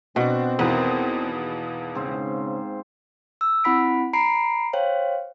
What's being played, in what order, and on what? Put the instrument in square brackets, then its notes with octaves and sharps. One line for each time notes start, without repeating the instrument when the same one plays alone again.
[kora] B2 [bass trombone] C4 [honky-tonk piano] D4 F#4
[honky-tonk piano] E2 B2 D#3 [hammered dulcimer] A#3 B3 [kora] B4
[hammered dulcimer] G#2 C4 C5 [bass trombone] C#3
[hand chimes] E6
C4 E4 F#5 B5 B6 D7
A#5 B5 C7 D7
C5 C#5 F5 G5